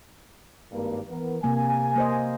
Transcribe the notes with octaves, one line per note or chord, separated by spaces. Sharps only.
G#1 G2 A#3
E3 B3 A#4
C3 A#3 G#5
A#3 C5 D#5